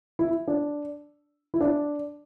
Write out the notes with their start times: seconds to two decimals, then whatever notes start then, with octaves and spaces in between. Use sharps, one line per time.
0.19 E4
0.48 D4
1.54 E4
1.60 D4